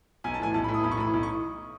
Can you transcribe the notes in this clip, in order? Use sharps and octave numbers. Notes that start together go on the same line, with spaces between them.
B1 G#5
A5
A2 E3 G#5
B1 A5
B5
A2
E3 D#6
B1 B5
C#6
A2 E3 B5
B1
C#6